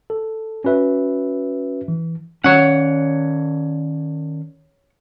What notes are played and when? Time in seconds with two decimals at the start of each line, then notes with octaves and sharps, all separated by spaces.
0.10 A4
0.64 C#4 F#4 B4 E5
1.88 E3
2.44 D#3 C#4 C#5 F#5